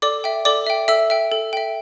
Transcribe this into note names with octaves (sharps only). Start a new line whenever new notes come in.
A4 D5 D6
E5 G5
A4 D5 D6
E5 G5
A4 E5 E6
E5 G5
A4
E5 G5